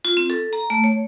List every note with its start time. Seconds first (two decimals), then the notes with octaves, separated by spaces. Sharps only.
0.05 F4
0.17 C4
0.30 A4
0.53 A#5
0.70 A3
0.84 C#5